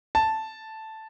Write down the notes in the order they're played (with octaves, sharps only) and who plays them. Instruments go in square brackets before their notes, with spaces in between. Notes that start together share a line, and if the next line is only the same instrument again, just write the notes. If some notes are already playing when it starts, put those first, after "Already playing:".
[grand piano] A5